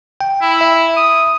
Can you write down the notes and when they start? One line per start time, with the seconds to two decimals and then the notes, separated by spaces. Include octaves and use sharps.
0.21 G5
0.42 E4
0.61 E5
0.97 D#6